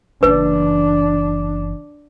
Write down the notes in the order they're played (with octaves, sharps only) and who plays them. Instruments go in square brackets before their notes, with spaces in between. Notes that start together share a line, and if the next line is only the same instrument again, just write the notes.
[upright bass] F#1 E3 [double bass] D4 [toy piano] B4